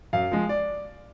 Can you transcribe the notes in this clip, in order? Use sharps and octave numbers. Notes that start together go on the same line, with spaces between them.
F#2 F5
F3 G#3
D5